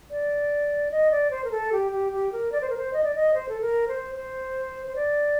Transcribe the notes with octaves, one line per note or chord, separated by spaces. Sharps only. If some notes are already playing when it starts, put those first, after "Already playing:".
D5
D#5
D5
C5
A#4
A4
G4
G4
G4
A#4
D5
C5
A#4
C5
D#5
D5
D#5
C5
A4
A#4
C5
C5
C5
D5